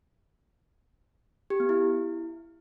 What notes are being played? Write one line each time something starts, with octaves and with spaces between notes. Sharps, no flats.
G4
B3
E4